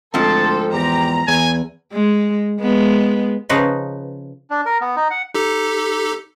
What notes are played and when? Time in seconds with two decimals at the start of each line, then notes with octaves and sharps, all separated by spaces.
0.14 D2 G#2 F3 C4 A4 A5
0.73 E2 G4 A#5
1.28 E2 G#5
1.92 G#3
2.59 G#3 B3
3.49 C#3 F3 D#4 B4
4.50 D4
4.66 A#4
4.81 B3
4.96 D#4
5.10 F#5
5.34 D#4 G4 A4